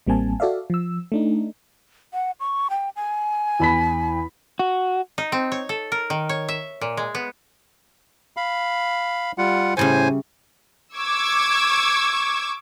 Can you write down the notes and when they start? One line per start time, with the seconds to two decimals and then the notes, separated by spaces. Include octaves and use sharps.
0.07 A1 G3 A#3 C4 G#5 A5
0.40 F#4 A4 D5 E5 F5
0.70 F3 E6
1.12 A3 D4 D#4
2.14 F#5
2.40 C#6
2.70 G5
2.96 G#5
3.60 E2 B5 B6
4.59 F#4
5.18 D#4
5.32 C4
5.52 C#5
5.69 A4
5.92 A#4
6.10 D#3
6.29 C#5
6.48 E5
6.81 A#2
6.97 G#3
7.15 B3
8.37 F5 B5
9.38 G3 F4 F#5
9.77 A2 C#3 G3 A3 C5 G#5
10.97 C#6 D6 E6 G#6